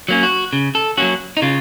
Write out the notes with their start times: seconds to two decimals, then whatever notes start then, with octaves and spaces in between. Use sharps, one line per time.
0.08 F#3 A#3 C#4
0.23 F#4
0.53 C#3
0.75 A4
0.97 F#3 A#3 C#4 F#4
1.37 D#4
1.42 C#3 F4